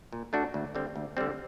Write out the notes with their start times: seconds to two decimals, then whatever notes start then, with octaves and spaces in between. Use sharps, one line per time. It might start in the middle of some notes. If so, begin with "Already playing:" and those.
0.12 A#2
0.33 A3 D4 F#4
0.54 D2
0.75 D3 G3 C4
0.96 D2
1.17 D3 G3 C4